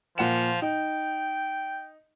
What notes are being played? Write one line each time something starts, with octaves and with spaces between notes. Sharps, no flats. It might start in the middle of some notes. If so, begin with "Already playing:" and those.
A#2 F3 F#5 E7
D#4 G5